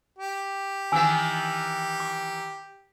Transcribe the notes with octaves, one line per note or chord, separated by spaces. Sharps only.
G4
D#3 E3 E5 G#5 E6
D6